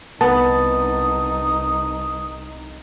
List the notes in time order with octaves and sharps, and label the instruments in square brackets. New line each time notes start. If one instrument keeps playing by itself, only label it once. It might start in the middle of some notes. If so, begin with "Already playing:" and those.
[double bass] C2 D#4 [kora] B3 [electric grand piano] A5 [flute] D#6